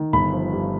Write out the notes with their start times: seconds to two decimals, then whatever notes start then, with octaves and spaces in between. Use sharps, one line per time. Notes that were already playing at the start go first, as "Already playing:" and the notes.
Already playing: D#3
0.13 G1 B5
0.33 F3
0.53 G2